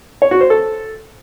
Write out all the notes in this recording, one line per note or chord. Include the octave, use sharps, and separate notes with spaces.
C#5
F#4
C5
A4